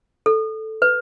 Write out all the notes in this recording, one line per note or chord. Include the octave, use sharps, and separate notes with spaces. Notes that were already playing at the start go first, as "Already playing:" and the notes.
A4
B4